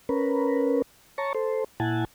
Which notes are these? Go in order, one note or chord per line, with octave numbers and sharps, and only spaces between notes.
C#4 A#4 B4
C#5 A5 A#5 C#6
A4 C5
A#2 E4 F#5 G#5 A5